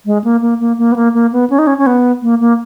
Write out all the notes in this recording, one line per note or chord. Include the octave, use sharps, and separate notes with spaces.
G#3
A#3
A#3
A#3
A#3
B3
A#3
A#3
B3
C#4
D#4
C#4
C#4
B3
A#3
A#3